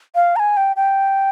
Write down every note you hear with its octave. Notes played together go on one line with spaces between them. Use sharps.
F5
A#5
G#5
G5
G5